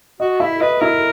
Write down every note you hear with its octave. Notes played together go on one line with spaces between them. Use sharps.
F#4 D#5
E4 E5
B4 D#5
E4 A#4